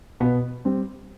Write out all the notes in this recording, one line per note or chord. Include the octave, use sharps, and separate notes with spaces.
B2 B3
G3 C4